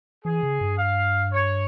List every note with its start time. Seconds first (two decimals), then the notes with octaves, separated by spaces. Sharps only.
0.25 E3 G#4
0.43 C#3
0.61 G2
0.78 F5
1.32 C#5